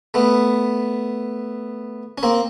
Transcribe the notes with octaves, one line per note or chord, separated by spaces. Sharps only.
A3 B3
C#4
A#3 C4